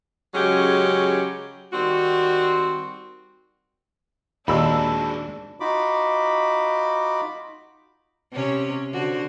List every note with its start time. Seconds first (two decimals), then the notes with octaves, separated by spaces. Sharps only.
0.34 C#3 F#3 G#3 C#4 G4
1.73 D#3 G3 C4 F#4
4.48 D#2 A#2 D4 D#4 F#4 G#4 B5 E6
5.60 D#4 F4 F#4 B5 D6
8.32 C3 C#4 C#5
8.92 D3 F#4 C5